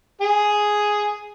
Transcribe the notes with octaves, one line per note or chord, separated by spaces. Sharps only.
G#4 G#5